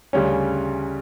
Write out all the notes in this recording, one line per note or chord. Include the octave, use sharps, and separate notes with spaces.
D2 C#3 G3 C#4